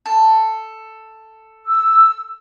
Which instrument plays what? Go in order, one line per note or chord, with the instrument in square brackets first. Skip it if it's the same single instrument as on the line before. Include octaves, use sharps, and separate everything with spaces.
[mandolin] A4
[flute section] E6